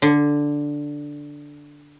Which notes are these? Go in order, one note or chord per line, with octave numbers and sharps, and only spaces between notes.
D3